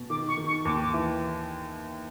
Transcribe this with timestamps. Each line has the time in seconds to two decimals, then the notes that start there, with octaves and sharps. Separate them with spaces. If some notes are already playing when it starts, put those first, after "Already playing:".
Already playing: B2
0.10 D#3 D6
0.28 C#6
0.37 D#3
0.47 C#6
0.65 D#2 D6
0.84 D6
0.93 E3